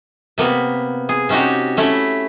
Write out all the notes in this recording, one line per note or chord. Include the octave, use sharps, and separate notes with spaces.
C3 A#3 B3
G#4
C3 C#4 D#4 F#4 G4
A3 C#4 E4